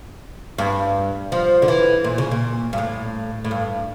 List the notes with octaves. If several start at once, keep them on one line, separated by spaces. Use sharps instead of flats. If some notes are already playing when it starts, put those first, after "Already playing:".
G2
F3
D3
E3
A#2
C#3
A#2
G2
A2
A2
G2